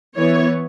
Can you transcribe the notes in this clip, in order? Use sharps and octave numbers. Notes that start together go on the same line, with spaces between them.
E3 B3 C#5